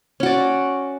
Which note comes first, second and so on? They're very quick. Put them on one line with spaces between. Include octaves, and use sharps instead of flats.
C#4 F#4 D5